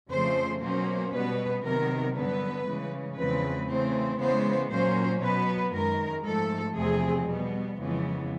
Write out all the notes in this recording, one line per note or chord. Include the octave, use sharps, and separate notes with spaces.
F2 C#3 F3 A3 C5
B2 F#3 A#3 C#4 C5
B2 G3 B3 B4
C3 D#3 F#3 B3 A#4
G2 D3 F#3 B3 B4
C#3 E3 G#3
E2 C#3 F3 G#3 C4 B4
C#3 E3 A3 C4 C5
C#3 E3 G#3 B3 C5
A#2 F#3 A#3 C#4 C5
B2 F#3 B3 B4
F#2 D#3 G#3 A#4
G#2 F3 A3 A4
E2 C3 F3 A3 C4 G#4
B2 G3 B3
F2 C#3 E3 G#3 B3